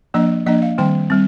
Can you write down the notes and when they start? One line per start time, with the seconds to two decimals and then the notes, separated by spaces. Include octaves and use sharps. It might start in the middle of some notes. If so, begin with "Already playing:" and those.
0.14 F3 A#3 D4 D#5
0.46 F3 A#3 D4 D#5
0.62 F5
0.78 D#3 G3 C4 G5
1.10 G3 C4